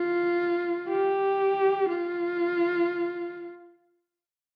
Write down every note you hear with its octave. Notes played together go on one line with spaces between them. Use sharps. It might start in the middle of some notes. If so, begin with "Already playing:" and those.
Already playing: F4
G4
F4